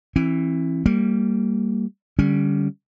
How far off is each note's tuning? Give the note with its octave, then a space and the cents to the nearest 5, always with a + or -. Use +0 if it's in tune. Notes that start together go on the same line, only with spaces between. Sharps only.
E3 +0 C4 +45
G3 +0 A#3 -20
D3 +0 G3 +0 C#4 +15